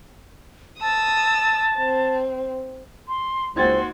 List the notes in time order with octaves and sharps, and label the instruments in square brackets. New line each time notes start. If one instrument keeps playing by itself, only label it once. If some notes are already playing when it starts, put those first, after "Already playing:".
[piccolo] A5 [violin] D#6 E6
[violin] C4
[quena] C6
[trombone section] C#2 C4 [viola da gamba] A#3 F#4 [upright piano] D#4 G#6 A6 [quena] C6